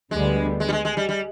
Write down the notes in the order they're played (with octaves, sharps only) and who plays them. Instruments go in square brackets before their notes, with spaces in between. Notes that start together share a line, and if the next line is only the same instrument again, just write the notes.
[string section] D2 D3 G3 B3 [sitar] G#3
[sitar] G#3
G3
G#3
G#3
G3
G3